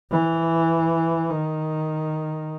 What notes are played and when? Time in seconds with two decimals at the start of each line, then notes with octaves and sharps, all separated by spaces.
0.10 E3
1.30 D#3